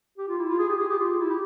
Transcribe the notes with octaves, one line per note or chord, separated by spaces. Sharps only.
G4
F4
E4
F4
G#4
G4
G#4
G4
F4
F4
E4
G4